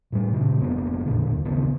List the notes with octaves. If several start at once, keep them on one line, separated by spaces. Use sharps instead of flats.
A2 G3
A#2 C#3
F1 A#3 B3
A1 A#2 D3
D#1
D#1 A#1 C#3 B3